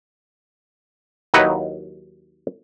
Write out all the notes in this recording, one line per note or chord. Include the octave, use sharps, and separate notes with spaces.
D#2 F#3 D#4 E4 B4 F#5